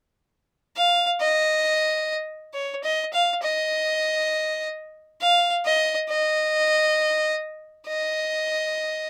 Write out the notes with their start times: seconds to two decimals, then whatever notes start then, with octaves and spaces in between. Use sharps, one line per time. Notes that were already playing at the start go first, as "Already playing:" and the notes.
0.77 F5
1.21 D#5
2.54 C#5
2.84 D#5
3.13 F5
3.42 D#5
5.21 F5
5.65 D#5
6.09 D#5
7.87 D#5